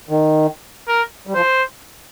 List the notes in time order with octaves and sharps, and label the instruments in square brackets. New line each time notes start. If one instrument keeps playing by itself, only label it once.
[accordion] D#3
[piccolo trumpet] A#4
[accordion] G3
[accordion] F3 [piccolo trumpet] C5